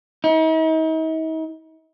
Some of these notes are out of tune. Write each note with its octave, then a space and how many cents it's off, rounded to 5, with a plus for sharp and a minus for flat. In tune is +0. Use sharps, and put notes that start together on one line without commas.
D#4 +45